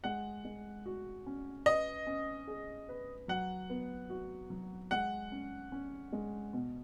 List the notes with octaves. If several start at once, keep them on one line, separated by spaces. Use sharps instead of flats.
G#3 F#5
G#3
F#4
C#4
B4 D#5
C#4
G#4
B4
F#3 F#5
B3
F#4
F#3
G#3 F#5
C#4
C#4
G#3
B2